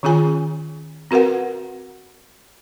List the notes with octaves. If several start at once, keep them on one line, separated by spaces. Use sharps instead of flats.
D#3 C#4 F4 G#4 G#5
C4 F#4 A#4 B4 F#5